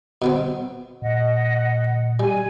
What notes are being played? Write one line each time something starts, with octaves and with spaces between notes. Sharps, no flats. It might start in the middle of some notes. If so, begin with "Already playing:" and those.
B2 B3 C4
A#2 D#5 F#5
G3 G#5